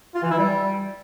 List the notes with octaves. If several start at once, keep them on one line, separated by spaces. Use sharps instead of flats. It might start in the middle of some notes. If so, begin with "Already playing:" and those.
F4
E3
E4
G3